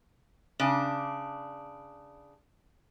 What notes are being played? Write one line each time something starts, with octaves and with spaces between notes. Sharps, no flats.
C#3 D4